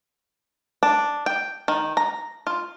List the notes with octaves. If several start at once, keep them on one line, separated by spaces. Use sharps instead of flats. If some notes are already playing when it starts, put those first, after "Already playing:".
D4
G5
D#3
A#5
F4